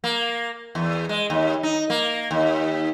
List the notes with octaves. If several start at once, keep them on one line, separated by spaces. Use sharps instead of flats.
A#3
E2
G#3
D#2
D#4
A#3
D#2